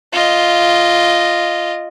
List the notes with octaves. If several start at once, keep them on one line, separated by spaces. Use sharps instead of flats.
F4 D#5